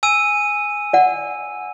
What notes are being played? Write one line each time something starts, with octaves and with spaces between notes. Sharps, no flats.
G#5 E6 D#7
D5 F#5